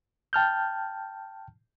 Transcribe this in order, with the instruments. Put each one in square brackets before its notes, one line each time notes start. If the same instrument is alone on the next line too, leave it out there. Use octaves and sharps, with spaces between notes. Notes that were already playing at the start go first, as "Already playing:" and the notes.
[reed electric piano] G5 A5 F6 G6